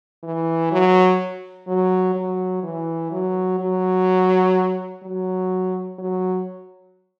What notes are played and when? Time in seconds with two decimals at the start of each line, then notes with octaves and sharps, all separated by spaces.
0.23 E3
0.72 F#3
1.68 F#3
2.16 F#3
2.63 E3
3.11 F#3
3.59 F#3
5.03 F#3
5.99 F#3